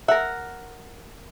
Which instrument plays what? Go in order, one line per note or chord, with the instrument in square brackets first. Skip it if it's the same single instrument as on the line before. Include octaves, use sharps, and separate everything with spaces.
[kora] A#4 F#5 [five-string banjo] E5